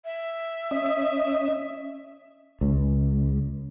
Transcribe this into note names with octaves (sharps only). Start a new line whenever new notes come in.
E5
C#4 D#5
C#2